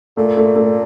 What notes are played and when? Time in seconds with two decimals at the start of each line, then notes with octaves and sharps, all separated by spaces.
0.17 A#2 A3
0.37 A3
0.56 A3